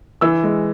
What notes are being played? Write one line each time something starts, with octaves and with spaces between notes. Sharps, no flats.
E3 E6
G#3